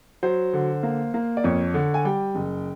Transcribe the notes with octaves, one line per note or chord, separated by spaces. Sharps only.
F#3 C5
D3
A#3
A#3
D5
F2 C#5
D3
G#5
G3 G5
F#1